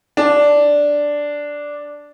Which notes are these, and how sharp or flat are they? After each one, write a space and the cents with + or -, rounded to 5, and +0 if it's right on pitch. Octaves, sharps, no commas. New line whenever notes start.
D4 -5